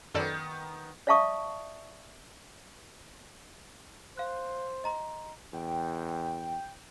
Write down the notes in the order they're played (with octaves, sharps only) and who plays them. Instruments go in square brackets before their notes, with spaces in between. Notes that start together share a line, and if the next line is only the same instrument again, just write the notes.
[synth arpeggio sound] F#2 A4 D5 [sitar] D#3 B3
[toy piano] D5 E5 F5 A5 C#6 D#6
[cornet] C5 [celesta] F5 F#6
[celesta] D#5 A#5 C6
[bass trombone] E2 [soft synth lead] G5